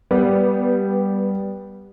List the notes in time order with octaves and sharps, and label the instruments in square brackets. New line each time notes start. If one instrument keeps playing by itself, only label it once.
[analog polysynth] G3 [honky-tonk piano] B3